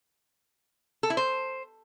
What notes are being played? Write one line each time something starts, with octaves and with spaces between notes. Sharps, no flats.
A4
E4
C5